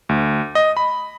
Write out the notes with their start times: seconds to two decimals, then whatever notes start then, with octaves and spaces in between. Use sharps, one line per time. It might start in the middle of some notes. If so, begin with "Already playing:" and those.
0.09 D2
0.55 D#5
0.77 B5